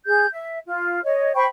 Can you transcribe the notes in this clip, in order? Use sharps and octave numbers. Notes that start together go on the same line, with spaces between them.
G#4 G6
E5
F4
C#5 D#5
C5 G5 B5 C#6